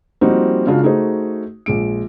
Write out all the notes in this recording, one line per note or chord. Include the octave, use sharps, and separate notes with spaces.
F3 G3 A#3 C4 D#4 F#4
C#3 G#3 D4 F4 F#4
A3 D#4 F#4 G#4 C5
A#1 G#3 D7